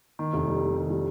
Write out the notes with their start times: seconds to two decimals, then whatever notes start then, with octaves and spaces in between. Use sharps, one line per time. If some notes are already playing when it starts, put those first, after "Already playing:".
0.19 D#3
0.34 F1
0.48 G3
0.62 G3
0.76 D#3
0.90 G3